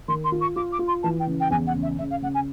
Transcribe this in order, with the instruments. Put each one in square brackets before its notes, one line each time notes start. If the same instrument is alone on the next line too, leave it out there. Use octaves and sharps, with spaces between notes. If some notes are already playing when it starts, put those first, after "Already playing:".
[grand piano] D#3 [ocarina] C6
[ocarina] C6
[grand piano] F4
[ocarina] C#6
[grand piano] F4 [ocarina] D6
[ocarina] D6
[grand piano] F4
[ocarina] C6
[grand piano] E3 [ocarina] A5
[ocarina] G5
[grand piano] C#3
[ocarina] G5
[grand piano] E2 [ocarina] G#5
[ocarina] F#5
[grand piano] C#3
[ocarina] E5
[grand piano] C#3 [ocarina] E5
[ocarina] F5
[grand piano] C#3 [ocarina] F#5
[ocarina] G#5